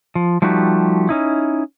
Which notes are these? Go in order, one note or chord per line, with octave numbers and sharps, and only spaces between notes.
F3
F3 G3 A3 D#4 F#4 G4
C#4 D#4 E4